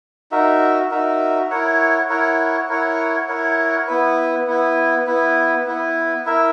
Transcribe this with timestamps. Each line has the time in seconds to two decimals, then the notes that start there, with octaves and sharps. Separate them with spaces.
0.31 D#4 F#4 A#4 E5
0.91 D#4 F#4 A#4 E5
1.51 E4 A#4 C#5 F#5
2.09 E4 A#4 C#5 F#5
2.69 E4 A#4 C#5 F#5
3.28 E4 A#4 C#5 F#5
3.88 B3 E4 B4
4.47 B3 E4 B4
5.07 B3 E4 B4
5.66 B3 E4 B4
6.26 E4 A#4 E5